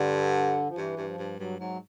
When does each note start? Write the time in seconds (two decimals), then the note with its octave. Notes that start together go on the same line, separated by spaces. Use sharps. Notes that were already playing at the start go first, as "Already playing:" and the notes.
Already playing: G2 D3
0.69 F3
0.77 G2 E3
0.97 G2
1.07 F3
1.18 G2
1.39 G2 F#3
1.59 G#2 F#3